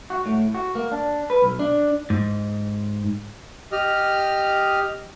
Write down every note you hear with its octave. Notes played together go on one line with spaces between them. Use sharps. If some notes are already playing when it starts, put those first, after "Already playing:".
F#4
A2
F#4
A#3
D4
B4
B1
D4
G#2
G4 D#5 F6